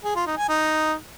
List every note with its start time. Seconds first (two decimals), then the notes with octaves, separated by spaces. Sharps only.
0.04 G#4
0.15 F4
0.27 D#4
0.38 G#5
0.49 D#4